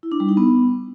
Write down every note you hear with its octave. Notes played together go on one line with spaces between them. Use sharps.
E4
D4
G3
D#4
B3